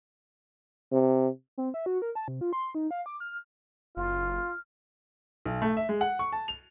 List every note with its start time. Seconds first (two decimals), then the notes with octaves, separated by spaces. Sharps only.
0.92 C3
1.58 C4
1.74 E5
1.86 F#4
2.02 A#4
2.15 A5
2.28 C3
2.41 F4
2.53 C6
2.75 D#4
2.91 F5
3.06 D6
3.20 F6
3.97 F#1 F4 F6
5.46 B1
5.62 A3
5.77 E5
5.89 G#3
6.01 F#5
6.19 C#6
6.33 A5
6.48 F7